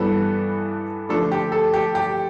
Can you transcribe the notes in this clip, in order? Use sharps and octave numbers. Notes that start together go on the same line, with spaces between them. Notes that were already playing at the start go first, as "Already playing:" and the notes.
Already playing: G2 E3 G3 B3 A4
D3 F3 A3 D4 A4
G4
A4
G4
G4